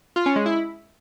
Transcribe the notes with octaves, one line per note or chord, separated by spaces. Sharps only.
F4
C#4
G#3
E4